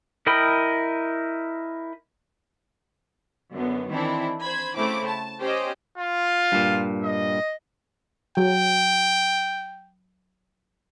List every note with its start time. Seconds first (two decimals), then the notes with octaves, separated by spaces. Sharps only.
0.27 E4 A#4 D#5 G5 B5
3.53 F#2 D3 B3
3.90 D#3 E3 C4 D4 E4
4.42 C5 B5 G#6
4.75 C#3 A3 C4 E4 D6
5.07 A5
5.40 C#4 G4 C5 D#5 G5
5.98 F4
6.52 G2 A#2
7.04 D#5
8.37 F#3 G5